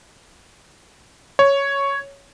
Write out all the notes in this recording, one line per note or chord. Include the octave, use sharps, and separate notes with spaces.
C#5